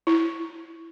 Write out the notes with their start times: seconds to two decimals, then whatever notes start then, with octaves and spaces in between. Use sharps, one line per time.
0.07 E4